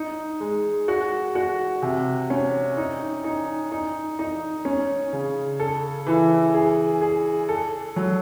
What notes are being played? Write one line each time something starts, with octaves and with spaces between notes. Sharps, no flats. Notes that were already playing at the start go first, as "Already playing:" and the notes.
Already playing: D#4
G#3
F#4
F#4
C3
C#4
D#4
D#4
D#4
D#4
C#4
C#3
A4
E3
G#4
G#4
A4
F#3